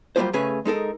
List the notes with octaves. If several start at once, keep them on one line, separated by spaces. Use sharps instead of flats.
F#3 G3 A3 A#3 F4 C5
C#3 A3 C#4 G#4 B4 G#5
G#3 D#4 A4 A#4